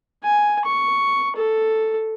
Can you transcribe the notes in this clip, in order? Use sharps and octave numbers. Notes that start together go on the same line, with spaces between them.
G#5
C#6
A4